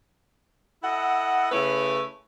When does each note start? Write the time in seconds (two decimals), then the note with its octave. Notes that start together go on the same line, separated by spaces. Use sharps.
0.83 E4 A4 D#5 F#5
1.51 C#3 A3 C#4 E4 B4